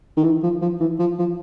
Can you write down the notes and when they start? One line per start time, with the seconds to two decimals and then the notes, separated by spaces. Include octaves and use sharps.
0.17 D#3
0.24 E3
0.43 F3
0.62 F3
0.81 E3
1.00 F3
1.19 F3